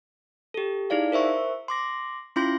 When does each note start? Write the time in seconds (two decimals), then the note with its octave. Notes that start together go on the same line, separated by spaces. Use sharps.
0.54 G4 A4
0.90 D#4 E4 G#4 D5 F5
1.12 A#4 C5 E5 C#6
1.68 C6 D6 A#6
2.36 C#4 E4 F4 C6 G6 A#6